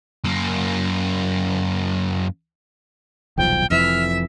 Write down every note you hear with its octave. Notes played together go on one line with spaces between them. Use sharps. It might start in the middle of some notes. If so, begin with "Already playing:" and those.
F#2 A#3
D#1 B1 F3 G5
F1 F2 E3 E5 F6